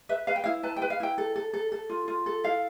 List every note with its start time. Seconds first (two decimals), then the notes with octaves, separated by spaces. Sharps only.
0.09 B4 E5
0.27 B4 F5
0.36 G5
0.44 E4 F5
0.63 B4 A5
0.76 G5
0.82 B4
0.90 F5
1.00 E4 G5
1.18 A4
1.36 A4
1.53 A4
1.72 A4
1.90 F4
2.08 F4
2.26 A4
2.44 E4 F5